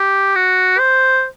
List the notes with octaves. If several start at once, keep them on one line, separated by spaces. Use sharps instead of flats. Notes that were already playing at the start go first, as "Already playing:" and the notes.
Already playing: G4
F#4
C5